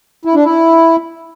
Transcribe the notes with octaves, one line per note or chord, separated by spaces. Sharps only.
E4
D4
E4